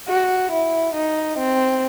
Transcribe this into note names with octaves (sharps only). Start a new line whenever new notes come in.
F#4
E4
D#4
C4